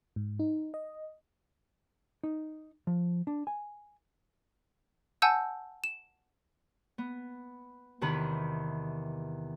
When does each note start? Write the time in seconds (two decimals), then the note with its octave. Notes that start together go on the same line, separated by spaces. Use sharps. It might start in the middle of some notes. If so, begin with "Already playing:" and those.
0.16 G#2
0.39 D#4
0.74 D#5
2.23 D#4
2.87 F3
3.27 D4
3.47 G#5
5.22 F#5 G#5 A5 E6 G6
5.84 E7
6.98 B3
8.01 E2 C3 D#3 B4 B5